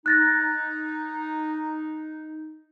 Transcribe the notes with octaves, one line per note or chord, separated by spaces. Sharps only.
D#4 F#6 A6 A#6